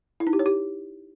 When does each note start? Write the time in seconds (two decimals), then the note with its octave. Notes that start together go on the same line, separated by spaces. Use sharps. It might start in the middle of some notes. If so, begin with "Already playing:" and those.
0.20 E4
0.27 D#4
0.33 G4
0.39 C#5
0.46 G4